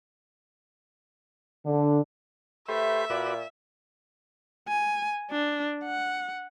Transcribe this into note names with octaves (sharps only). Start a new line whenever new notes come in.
D3
A3 G4 B4 C5 E5
A#2 F#4 B4 D5
G#5
D4
F#5